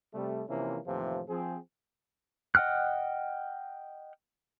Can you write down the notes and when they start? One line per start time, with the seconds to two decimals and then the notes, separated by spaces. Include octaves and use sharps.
0.14 C3 G3 A3
0.49 C3 E3 F3 A#3 C#4 E4
0.86 D#2 A2 C3 E3 F3
1.29 F3 C4 G#4
2.55 D#5 F#5 G5 F6 F#6